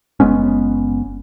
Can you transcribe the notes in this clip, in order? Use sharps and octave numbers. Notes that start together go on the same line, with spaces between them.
F#1 G#3 B3 C#4